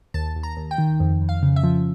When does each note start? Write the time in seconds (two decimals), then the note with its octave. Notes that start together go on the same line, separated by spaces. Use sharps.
0.14 D#2 A5
0.36 D#2
0.43 A#5
0.57 D#2
0.71 G5
0.78 D#3
1.00 F2
1.22 F2
1.29 F5
1.43 C#3
1.56 E5
1.63 F3